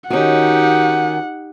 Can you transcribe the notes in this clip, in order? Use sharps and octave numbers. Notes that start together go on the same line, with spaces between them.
D#3 C#4 D#4 F#4 G4 F#5